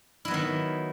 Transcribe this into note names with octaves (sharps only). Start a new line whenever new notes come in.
D#3 F#3 B3 E4